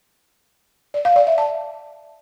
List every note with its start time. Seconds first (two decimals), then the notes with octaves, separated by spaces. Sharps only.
0.94 D5
1.05 F5
1.16 D5
1.27 E5
1.38 A5